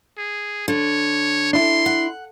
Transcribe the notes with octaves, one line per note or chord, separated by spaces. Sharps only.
G#4
D3 C#5
D4 E4 C6
F#5